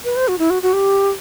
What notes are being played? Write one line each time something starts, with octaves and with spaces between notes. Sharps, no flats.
B4
C5
F#4
E4
F#4
F#4
G4